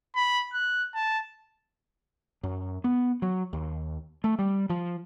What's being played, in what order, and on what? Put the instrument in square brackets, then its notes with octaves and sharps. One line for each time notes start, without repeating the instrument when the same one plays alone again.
[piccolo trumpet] B5
F#6
A5
[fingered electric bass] F#2
B3
F#3
D#2
A3
G3
F3